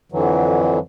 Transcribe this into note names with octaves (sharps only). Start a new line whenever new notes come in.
F2 D3 E3 F#3